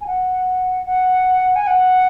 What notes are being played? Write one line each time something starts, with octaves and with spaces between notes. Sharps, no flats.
G#5
F#5
F#5
G#5
F#5